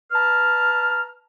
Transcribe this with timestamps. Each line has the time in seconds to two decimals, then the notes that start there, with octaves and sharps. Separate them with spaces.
0.12 B4 A5 A#5 F6